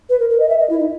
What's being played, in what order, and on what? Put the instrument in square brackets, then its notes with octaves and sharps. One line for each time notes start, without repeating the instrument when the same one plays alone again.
[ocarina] B4
A#4
A#4
D#5
E5
D#5
E4
D#4